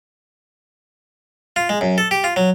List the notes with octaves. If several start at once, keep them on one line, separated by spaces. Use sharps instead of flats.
F4
G#3
F#2
A4
G4
F4
F#3